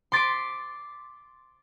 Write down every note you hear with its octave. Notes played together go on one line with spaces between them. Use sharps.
C6 D6 A6 B6 C7 D7